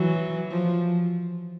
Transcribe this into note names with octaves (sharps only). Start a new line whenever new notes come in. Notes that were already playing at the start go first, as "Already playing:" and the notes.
Already playing: E3 F#3
F3